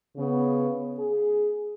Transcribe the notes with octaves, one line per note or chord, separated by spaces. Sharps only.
C#3 B3
G#4